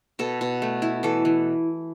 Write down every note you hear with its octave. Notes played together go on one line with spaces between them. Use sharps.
B2 A4
B2
A3
E4
E3 A4
E3